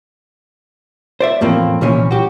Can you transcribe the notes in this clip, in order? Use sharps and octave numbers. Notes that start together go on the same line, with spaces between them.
C5 D5 E5
E2 A2 F3 A#3 C4
C2 A#2 E3 F3 C#4
F#4 G4